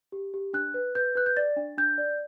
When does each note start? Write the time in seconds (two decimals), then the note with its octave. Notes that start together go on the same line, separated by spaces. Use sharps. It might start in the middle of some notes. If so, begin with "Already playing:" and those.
0.12 G4
0.34 G4
0.54 D4 F#6
0.74 B4
0.95 B4 G6
1.15 B4 F#6
1.26 G6
1.37 D5 A6
1.56 D4
1.78 D4 G6
1.98 D5